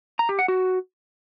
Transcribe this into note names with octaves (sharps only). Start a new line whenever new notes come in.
A#5
G4
F#5
F#4